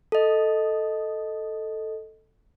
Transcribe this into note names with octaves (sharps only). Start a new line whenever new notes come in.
A4 D#5